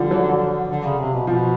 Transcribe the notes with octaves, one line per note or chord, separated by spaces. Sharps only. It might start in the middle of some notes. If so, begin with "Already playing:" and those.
Already playing: D3 F3 G3
F#3
D3
C#3
C3
B2
B2 F3